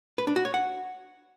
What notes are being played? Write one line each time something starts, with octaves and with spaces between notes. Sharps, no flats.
B4
D4
F#4
C#5
F#5